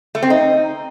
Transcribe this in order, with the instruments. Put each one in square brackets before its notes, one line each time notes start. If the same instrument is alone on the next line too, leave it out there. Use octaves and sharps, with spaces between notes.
[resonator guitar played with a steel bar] A3
C4
D#4